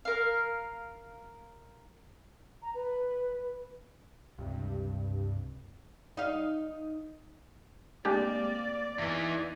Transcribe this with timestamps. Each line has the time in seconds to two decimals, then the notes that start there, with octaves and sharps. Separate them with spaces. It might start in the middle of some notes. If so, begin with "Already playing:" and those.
0.05 A#4 F5
2.62 A#5
2.74 B4
4.38 C#2 G2 C3
6.17 D#4 F5
8.05 G#3 A#3 C4 D4 G4 D5
8.98 E2 E3 D#4